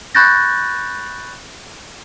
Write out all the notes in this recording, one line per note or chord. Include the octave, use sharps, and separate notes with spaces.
B5 C#6 F#6 G6 A6 A#6